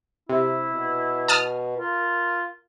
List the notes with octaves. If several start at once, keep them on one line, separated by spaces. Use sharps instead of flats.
C3 E4
B2
A5 D#6 F6
F4 A#4